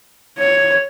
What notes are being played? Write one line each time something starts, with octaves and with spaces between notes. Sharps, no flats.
C#5